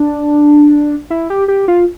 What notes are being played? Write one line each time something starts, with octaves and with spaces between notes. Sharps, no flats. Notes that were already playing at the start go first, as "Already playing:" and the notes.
Already playing: D4
E4
G4
G4
F4